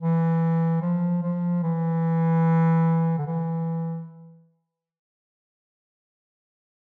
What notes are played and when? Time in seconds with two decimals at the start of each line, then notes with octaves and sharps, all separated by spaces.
0.01 E3
0.82 F3
1.23 F3
1.63 E3
3.18 D3
3.26 E3